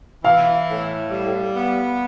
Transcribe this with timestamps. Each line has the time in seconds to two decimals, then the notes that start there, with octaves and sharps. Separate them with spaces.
0.24 E3 F5
0.68 A2
1.11 G3
1.53 B3